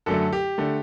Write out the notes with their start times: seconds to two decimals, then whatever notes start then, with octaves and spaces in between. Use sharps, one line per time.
0.06 F#2 D3 F#3 A3 A4
0.33 G4
0.58 D3 A3